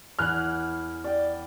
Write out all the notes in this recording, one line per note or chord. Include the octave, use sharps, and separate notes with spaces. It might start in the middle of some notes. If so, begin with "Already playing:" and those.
E2 G#5 F6 F#6
D5 G5